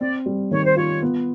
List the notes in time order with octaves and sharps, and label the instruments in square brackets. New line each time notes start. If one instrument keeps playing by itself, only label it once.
[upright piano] C4 [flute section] D5
[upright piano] G3
[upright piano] D#3 [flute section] C#5
[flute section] C5
[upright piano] F4 [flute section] C#5
[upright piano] B3